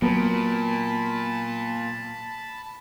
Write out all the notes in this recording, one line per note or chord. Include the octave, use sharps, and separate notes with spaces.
A#2 F#3 A#3 B3 A#4 A5 B5